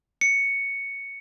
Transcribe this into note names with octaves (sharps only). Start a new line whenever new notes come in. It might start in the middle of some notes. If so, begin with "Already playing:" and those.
C#7